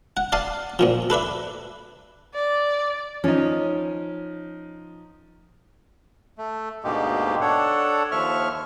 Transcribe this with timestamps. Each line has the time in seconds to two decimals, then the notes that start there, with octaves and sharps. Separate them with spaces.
0.17 F#5
0.32 D5 F5 A5 D#6
0.79 A#2 D#3 F3
1.10 A4 B4 D5 E5
2.34 D5
3.24 F3 C#4 D#4
6.38 A3
6.84 D2 G#2 B2 G#3 A#3 G4
7.41 D4 A4 C#5 F#5
8.12 D#2 F3 E5 C#6 F6